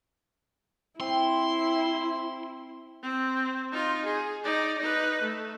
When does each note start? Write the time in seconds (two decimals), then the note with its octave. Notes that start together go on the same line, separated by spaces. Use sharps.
1.00 C4 E4 C6
3.03 C4
3.72 D#4 F4
4.06 G#4
4.44 D#4 D5
4.79 D#4 B4
5.22 A3